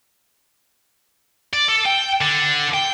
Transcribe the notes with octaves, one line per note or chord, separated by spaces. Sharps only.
D5
A4
G5
D3
G5